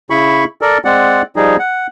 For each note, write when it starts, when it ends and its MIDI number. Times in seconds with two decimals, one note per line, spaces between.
0.10 0.44 49
0.10 0.44 64
0.10 0.44 83
0.10 0.44 85
0.61 0.78 69
0.61 0.78 70
0.61 0.78 74
0.85 1.22 56
0.85 1.22 60
0.85 1.22 74
0.85 1.22 78
1.36 1.57 53
1.36 1.57 55
1.36 1.57 63
1.36 1.57 68
1.59 1.87 78